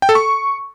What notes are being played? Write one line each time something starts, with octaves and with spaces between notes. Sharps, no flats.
G5
A4
C#6